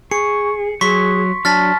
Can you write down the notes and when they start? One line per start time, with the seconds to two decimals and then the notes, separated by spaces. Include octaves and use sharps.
0.11 G#4 C#6 C#7
0.81 F#3 G#4 C6 C#6 B6
1.45 F#3 D4 A5 F6 A6 B6